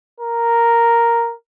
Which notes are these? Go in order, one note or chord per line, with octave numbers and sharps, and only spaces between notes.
A#4